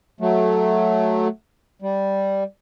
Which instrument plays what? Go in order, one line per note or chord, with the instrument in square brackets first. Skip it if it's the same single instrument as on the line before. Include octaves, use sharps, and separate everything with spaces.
[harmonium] F#3 A3
G3